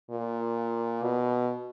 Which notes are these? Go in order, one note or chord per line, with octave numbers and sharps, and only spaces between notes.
A#2
B2